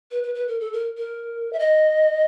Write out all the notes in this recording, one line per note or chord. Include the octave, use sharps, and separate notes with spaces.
B4
B4
B4
A#4
A4
A#4
A#4
E5
D#5